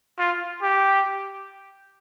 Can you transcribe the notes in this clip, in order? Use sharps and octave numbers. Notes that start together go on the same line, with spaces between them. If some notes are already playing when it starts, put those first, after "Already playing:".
F4
G4